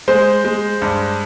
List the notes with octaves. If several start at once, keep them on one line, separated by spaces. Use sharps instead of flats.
G#3 C5
G#3
G2